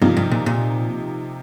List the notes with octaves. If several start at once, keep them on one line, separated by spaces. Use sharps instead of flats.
G2 C3 F3 A#3 D#4
G2
A#2
A#2